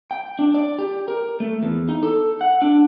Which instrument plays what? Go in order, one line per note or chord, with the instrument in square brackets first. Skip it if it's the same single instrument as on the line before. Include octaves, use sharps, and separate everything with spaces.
[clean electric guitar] G5
D4
D5
G4
A#4
A3
E2
D#4
A4
F#5
D4